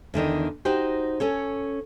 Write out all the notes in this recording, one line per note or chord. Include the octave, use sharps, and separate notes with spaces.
E2 D3 D#3 D#5
D#4 F#4 G4 C5
C#4 A4 C#5